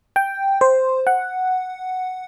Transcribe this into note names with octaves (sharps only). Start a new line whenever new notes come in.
G5
C5
F#5